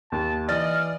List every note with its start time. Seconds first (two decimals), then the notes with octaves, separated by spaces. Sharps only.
0.12 D#2 A5
0.49 E3 D5 D#5 F6 A6